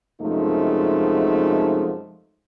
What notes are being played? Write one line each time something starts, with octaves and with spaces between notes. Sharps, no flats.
F#2 C3 F3 G#3 A3 D#4